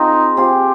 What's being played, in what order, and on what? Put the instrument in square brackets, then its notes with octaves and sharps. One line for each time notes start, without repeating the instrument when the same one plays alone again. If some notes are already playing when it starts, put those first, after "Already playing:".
Already playing: [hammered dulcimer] C4 F4 G#4 [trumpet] D#4
[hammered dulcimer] C4 F4 G#4 [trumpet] G4